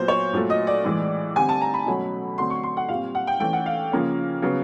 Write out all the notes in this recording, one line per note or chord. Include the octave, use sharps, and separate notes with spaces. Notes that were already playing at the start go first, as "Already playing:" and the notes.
Already playing: A#2 F#3 B3 C5
C#5
A#2 F#3 A3
D#5
D5
A2 E3 G#3
D3 G3 C4 G#5
A5
A#5
B5
B2 F#3 A3 C#4
D3 F#3 A3 C4 C6
C#6
C6
F#5
A#2 G3 C4 F5
F#5
G5
E3 A3 C#4 G5
F#5
F5
C#3 F3 A#3 C#4
C#3 F#3 B3